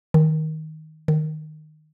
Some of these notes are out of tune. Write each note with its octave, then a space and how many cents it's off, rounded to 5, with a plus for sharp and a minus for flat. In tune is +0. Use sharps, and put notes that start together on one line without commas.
D#3 +10
D#3 -15